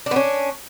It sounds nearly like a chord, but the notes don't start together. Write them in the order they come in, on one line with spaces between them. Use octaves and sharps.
D4 B3 C#4